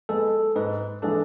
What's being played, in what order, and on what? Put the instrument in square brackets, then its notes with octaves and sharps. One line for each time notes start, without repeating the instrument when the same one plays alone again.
[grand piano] G#3 B3 [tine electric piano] A4
[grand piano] G#2 [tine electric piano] B4
[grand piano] E3 G#3 D4 [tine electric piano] A4